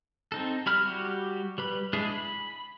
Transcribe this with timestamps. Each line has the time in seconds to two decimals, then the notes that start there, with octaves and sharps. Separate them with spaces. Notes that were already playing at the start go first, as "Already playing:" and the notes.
0.32 C4 D#4 A4
0.66 G3 E4 B5 F6
0.85 G3 F#4 G4
1.58 G3 B4 B5
1.93 G#3 D4 E4 G#4
2.12 B5